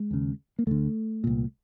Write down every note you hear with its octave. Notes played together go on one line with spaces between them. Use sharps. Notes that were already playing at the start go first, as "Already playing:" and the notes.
Already playing: G#3
D#2 C#3
A#3
D2 D3 A3
C2 A#2